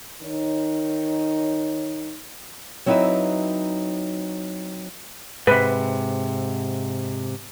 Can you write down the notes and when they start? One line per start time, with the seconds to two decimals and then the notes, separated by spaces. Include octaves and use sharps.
0.23 D#3 D#4 C#5
2.86 F#3 C4 D#4 E4 B4 E5
5.47 G#2 C3 B4